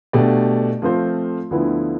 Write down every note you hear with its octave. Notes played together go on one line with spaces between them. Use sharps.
B2 A3 D4 G4 D5
F3 A3 C4 F4 C5
D2 D3 F3 B3 E4